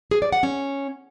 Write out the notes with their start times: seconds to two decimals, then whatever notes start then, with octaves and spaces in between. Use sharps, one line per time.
0.11 G#4
0.22 D5
0.32 F#5
0.43 C#4